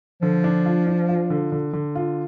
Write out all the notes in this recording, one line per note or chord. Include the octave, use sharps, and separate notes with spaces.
D3 F3
D4
F4
D4
F4
D3
D3
D3
F4